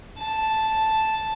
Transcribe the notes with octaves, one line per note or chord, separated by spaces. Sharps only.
A5